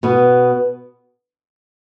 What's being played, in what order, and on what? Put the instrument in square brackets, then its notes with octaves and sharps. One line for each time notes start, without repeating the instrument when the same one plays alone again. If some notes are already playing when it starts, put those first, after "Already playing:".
[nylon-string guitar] B2 B3